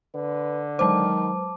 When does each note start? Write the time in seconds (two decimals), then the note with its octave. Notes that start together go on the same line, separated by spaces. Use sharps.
0.15 D3 B4
0.79 D#3 F#3 G#3 C5 A5 D6